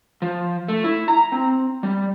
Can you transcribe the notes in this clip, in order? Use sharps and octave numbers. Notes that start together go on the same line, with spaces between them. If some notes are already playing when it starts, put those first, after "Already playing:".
F3
A3
E4
A#5
C4
G3